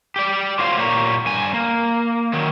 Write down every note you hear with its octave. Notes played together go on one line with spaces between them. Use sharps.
G4 D5
A2 F4 F#4 C5 C#5 F5
A#2 A#3 G4 C#5 A#5
G2 G#5
A#3
D#3 F#3